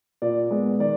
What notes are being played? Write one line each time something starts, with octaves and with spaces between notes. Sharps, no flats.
A#2 D5
G#3 B3
D#3 D5